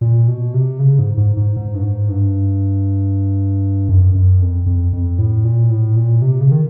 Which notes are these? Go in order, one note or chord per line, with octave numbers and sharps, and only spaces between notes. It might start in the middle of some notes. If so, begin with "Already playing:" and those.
A#2
B2
C3
C#3
G#2
G#2
G#2
G#2
G2
G#2
G2
F#2
F#2
F2
F2
F2
A2
A#2
A2
A#2
C3
C#3
D#3